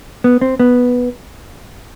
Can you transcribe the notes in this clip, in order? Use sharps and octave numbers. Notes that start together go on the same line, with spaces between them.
B3
C4
B3